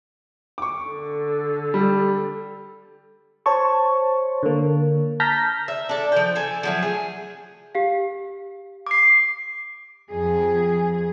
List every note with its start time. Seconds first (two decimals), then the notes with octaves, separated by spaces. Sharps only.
0.58 C#6 D6
0.89 D3
1.74 G3
3.46 C5 C#5 A5 C#6
4.43 D3 A#3
5.20 A5 A#5 F6 G6 A#6 B6
5.68 E5
5.89 D4 A4
6.12 F3 G5
6.35 A4 G#5
6.63 F3 F#3 A3
6.82 G#4
7.75 G4 F5
8.87 D6 C7
10.10 F2 G#4